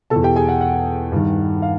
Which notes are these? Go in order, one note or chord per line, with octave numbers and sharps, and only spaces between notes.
B2 A4 A5
E2
G4 G5
G#4 G#5
F#5
F#5
G2 D#3
F5